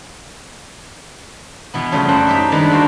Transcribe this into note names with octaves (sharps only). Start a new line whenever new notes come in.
B2 E3 B3
C#3 F3 G3 A3
F#2 C5 F#5 G5
D#4 G4 E5
D#3 G3 G#3 D4 B4 D5
D3 A#3 F#4 C5